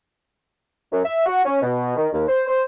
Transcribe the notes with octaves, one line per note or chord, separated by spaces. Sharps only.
F#2
E5
F#4
C#4
B2
D#3
D#2
C5
C5